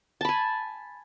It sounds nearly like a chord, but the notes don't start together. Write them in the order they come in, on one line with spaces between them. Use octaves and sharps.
A5 B5 G#5